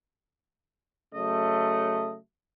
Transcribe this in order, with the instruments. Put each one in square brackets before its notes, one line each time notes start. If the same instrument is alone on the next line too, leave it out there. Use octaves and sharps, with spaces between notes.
[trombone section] C#3 F#3 A3 [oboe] D#5